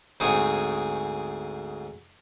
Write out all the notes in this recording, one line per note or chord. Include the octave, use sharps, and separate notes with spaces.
D2 G#2 C4 G#4 G#5 C#6